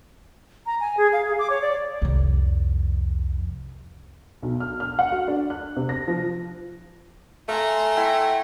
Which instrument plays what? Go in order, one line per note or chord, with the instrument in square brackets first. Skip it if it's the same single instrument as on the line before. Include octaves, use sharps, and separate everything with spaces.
[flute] A#5
G#5
G#4
F5
G#4
D6
C#5
D5
[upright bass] C2 F2
[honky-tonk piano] B1
F6
F6
F#5
F#4
D4
F#6
C3
A#6
F3
[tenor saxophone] A3 [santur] F5 G#5 [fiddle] A#5 C6
[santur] E4 F#5 G5